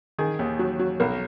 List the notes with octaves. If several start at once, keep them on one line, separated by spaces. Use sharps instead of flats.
D#3 G#4
D#2
F#3
F#3
B1 A#4